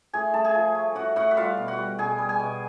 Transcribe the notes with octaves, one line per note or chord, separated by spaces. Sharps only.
A2 G#4 G#5
A2 A5
G#4 G#5
F3
A3
A2 F#4 F#5
A2 F#4 F#5
E5
G3 F4 F5
B2
F#4 F#5
G3
B2 G#4 G#5
G3
G#4 G#5
B2